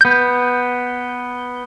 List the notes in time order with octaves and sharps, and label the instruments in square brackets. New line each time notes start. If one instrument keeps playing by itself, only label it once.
[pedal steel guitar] B3 G6